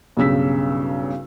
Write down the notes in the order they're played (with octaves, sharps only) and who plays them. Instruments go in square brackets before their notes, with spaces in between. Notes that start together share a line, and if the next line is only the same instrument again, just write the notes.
[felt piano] B1 G2 C#3 E6 B6